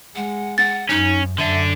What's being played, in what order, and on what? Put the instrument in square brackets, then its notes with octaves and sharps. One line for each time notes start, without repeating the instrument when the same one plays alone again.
[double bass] G#3 [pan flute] F#5
[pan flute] F#5 [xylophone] A6
[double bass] F#2 [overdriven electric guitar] C#4 [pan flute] D#4
[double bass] F#2 [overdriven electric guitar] D3 D4 [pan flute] E5